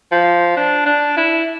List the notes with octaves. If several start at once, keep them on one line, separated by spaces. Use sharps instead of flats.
F3
D4
D4
E4